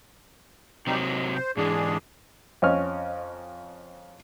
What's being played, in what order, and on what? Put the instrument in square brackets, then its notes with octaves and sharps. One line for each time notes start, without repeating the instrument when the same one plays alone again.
[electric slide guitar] C3 F#3 C4 [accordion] G3 D#4 G4
[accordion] D#5
C5
[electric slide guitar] G#2 E3 [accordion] G#3 D4 G#4
[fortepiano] F2 C#4 D#5 C#6 F6